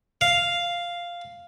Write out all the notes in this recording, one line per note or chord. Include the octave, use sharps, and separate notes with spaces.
F5